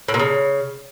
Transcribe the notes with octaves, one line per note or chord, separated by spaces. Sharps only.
A2
A#2
C#3